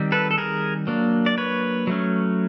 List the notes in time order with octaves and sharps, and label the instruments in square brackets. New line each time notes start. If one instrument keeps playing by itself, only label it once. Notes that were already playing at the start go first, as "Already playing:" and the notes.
Already playing: [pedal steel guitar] D#3 G3 C4
A4 B4
A4
G#4 A#4
F#3 A#3 D4
D5
B4 C#5
F#3 A3 C#4